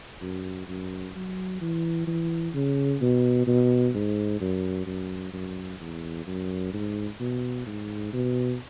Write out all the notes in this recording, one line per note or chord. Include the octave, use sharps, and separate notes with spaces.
F#2
F#2
F#3
E3
E3
C#3
B2
B2
G#2
F#2
F#2
F#2
E2
F#2
G#2
B2
G#2
B2